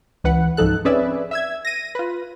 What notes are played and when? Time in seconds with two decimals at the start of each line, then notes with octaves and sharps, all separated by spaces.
0.24 C#2 E3 B4 F#5
0.57 C#2 G#2 F3 D#4 A4 F#6
0.85 C4 C#4 G#4 B4 D5 E5
1.31 E5 E6 G#6
1.65 A#6 D#7
1.95 F4 B4